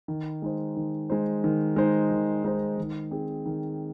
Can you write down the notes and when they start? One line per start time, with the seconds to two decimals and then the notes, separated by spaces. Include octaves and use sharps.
0.08 D#3
0.42 G#3 D#4 C5
0.77 D#3
1.10 G#3 D#4 C5
1.44 D#3
1.76 G#3 D#4 C5
2.11 D#3
2.44 G#3 D#4 C5
2.78 D#3
3.11 C4 G#4
3.46 D#3